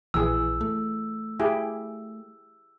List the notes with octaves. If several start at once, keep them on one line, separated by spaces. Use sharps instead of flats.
A#1 E3 G#4 E6
A3
E4 G4 G#4